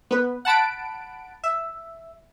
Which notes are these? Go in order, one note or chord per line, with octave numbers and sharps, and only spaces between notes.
B3 B4
F#5 A5 B5 D7
E5